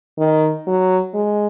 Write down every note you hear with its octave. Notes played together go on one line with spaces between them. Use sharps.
D#3
F#3
G#3